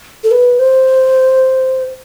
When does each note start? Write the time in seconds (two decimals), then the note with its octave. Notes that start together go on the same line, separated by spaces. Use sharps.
0.24 A4
0.31 B4
0.59 C5